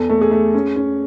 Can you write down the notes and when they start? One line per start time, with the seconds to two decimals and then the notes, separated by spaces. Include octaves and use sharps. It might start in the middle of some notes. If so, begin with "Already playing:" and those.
Already playing: E2 A4
0.09 A3
0.21 G#4
0.31 A3
0.54 C#4
0.76 C#4